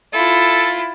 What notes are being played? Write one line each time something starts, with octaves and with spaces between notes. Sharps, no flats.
E4 F4 A4